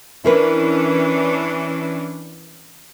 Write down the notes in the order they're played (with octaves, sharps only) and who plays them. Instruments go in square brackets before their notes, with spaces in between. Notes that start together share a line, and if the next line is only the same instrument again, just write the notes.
[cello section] E3 C#4 D4 [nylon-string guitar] E4 A#4 B4